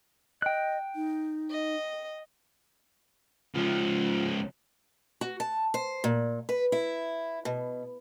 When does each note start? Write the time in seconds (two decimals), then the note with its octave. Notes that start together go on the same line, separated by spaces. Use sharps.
0.42 D#5 G5 F#6
0.96 D#4
1.51 D#5
3.55 C#2 F3 F4
5.21 F#4
5.40 A5
5.74 C5
6.04 A#2
6.49 B4
6.72 E4
7.45 B2